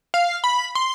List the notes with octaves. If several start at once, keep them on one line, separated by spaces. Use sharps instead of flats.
F5
B5
C6